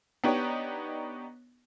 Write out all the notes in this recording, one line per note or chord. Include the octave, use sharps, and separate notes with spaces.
B3 D4 D#4 G4 C#5